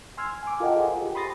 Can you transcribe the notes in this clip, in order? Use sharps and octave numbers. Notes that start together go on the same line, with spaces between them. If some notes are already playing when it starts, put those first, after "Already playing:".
G#5 C6 E6 F6 G#6
G#5 D6
F4 A4 A#4 D#5 F#5 G5
G#4 C5
G4
B5 C6 D#6 A6 A#6